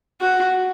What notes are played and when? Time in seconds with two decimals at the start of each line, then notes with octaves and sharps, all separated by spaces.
0.21 F#4